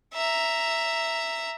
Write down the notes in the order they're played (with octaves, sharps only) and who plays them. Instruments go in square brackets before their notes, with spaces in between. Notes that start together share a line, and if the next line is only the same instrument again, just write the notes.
[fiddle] E5 A#5